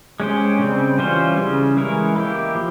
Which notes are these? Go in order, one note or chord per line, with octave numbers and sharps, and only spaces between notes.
G#3 C#4 G4 C5
C#3 G3 C4
E3 G3 C#4 F4 C5
C#3 G3 C#4
E3 G#3 E4 A#4 C#5
A#3 E4 G4
F3